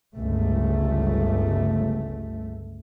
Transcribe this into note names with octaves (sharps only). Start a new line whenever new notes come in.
G1 C#2 A3